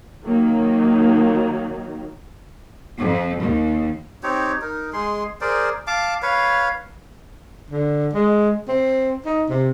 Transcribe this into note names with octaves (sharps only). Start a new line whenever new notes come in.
D#3 F#3 A#3 D#4
F2
D#2
C4 D#4 G4 C#5
D#4 A#4
G#3 G#4 C6
G#4 A#4 C5 D5
F5 A5 D6
B4 C#5 F5
D3
G#3
C4
D#4
C3